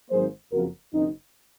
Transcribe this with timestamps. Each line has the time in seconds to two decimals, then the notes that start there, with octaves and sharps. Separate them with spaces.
0.10 G#1 G#2 F#3 A#3 G#4 C5
0.52 F#1 F2 C#3 F3 F#4 A#4
0.93 F#1 F#2 D#3 C4 D#4